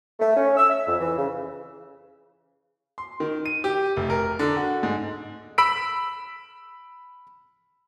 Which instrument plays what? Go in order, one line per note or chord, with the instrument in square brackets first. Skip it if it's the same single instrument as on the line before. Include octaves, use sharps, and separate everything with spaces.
[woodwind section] A3
C#4
E6
E5
F2
E3
C#3
[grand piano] C6
D#3
D#7
G4
F1
A#4
D3
F#4
G#2
[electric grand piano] B5 E6 B6 D7